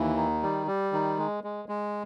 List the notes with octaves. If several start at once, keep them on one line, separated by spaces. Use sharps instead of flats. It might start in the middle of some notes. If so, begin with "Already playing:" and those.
Already playing: D#2 E3
D#3
G3
G3
D#3
G#3
G#3
G#3